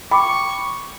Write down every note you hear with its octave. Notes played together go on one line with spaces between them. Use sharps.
G5 B5 C#6 D6